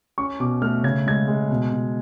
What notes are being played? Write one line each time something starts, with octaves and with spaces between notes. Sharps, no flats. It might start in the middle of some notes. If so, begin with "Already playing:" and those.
C#4 C#6
B2 D6
A3 F6
C#3 G#6
G#3 G#6
G#3
B2
B2